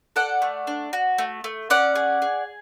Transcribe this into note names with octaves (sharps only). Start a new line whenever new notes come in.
A4 D5 F#5
A3
D4
F#4
A3
A3
C#4 D5 F#5
G#4
G#4